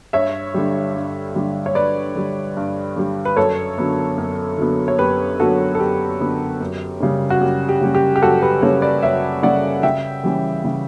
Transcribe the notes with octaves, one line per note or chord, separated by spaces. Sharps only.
G2 C#5 E5
D3 G3
G2
D3 G3
C#5
G2 B4 D5
D3 G3
G2
D3 G3
B4
F#2 A4 C#5
D3 F#3 B3
F#2
D3 F#3 B3
C#5
F#2 G4 B4
D3 F#3 B3 F#4 A4
A4
F#2 G4
D3 F#3 B3
F#2
C#3 G3 C#4
F#4
F#2 G4
G4
C#3 G3 C#4
G4
G4
F#2 F#4 A4
G4 B4
C#3 G3 C#4 A4 C#5
B4 D5
F#2 C#5 E5
C#3 G3 C#4 D5 F#5
C#3 E5 G5
E3 G3 C#4
C#3